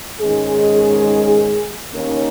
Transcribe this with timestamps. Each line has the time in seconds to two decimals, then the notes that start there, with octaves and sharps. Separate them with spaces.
0.20 G#2 D#3 G#3 C#4 G#4
1.93 D#2 D#3 A#3 C#4 A#4